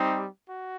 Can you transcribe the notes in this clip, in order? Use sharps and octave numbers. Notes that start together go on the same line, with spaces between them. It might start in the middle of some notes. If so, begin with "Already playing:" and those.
Already playing: G3 C4 D#4 G4
F#4